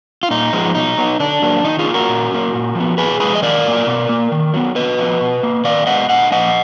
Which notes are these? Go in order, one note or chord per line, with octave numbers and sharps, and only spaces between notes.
F4
A#2 D#4
F3 G#3 B3
B2 D#4
F#3 B3
D3 D4
F#3 A#3
D#3 D#4
F4 G#4
A#3
F#4 A#4
A#2
F#3 A#3
A#2
F3 B3
A#2 G#4 B4
F3 G#3 B3 G#4 B4
D#5
D#3 A#4 D5
F#3 A#3
B2
A#3
D#3
F#3 B3
D3 B4 D#5
F3 B3
B2
A#3
D#3 D5 F5
G#3 B3 D#5 F#5
D3 D#5 F#5
F3 A#3 D#5 F#5